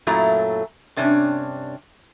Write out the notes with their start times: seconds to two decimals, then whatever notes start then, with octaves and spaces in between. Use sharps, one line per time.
0.07 F#2 A#2 F#3 A3 E4 A#5
0.97 G2 C3 C#4 D4